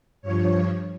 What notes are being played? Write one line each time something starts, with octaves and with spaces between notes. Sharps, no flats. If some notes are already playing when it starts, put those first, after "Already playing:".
G2 F3 C#5